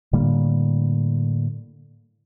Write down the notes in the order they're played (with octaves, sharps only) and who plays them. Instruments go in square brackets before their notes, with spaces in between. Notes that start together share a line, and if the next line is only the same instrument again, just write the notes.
[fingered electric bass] A2 D3 G3 A#3